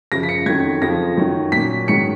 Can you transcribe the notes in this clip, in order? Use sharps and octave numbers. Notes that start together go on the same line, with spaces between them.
F#2 C#3 F3 A#6
B6
C#7
F2 D#3 F#3 G#6
F2 C#3 F3 A#6
F#2 D#3 F#3
A#2 F#3 B6
G#2 D#3 F#3 C#7